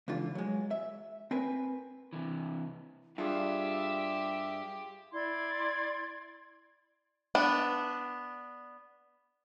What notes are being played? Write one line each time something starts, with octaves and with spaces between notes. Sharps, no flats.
C#2 D3 E3 F4
F#3 G#3
E5
C4 A#4 B4 G#5
C3 E3
G2 F4 G4 G#4 E5
E4 D5 C6 G#6
B3 D4